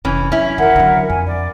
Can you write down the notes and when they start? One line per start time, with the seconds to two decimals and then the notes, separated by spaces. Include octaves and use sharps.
0.05 F1 E3 C#4
0.32 F#3 C#4 E4
0.58 F2 D#3 A#4 E5 F#5
0.76 D3 F#3
1.10 F2 G#5
1.26 D5